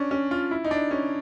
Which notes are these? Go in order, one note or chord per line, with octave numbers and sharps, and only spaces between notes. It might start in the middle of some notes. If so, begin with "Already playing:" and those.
Already playing: C#4 D4
C#4
F4
E4
D#4
D4
C#4